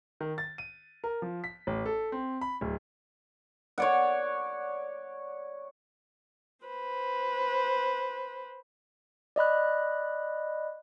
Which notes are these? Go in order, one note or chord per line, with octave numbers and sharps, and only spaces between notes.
D#3
A6
D#7
A#4
F3
B6
A1
A4
C4
B5
D1
C#5 D5 F#5
B4 C5
D5 D#5 B5 F#6